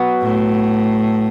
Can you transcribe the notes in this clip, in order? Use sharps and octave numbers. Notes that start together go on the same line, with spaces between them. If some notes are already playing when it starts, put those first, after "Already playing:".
Already playing: F#3 B3 F#4
A2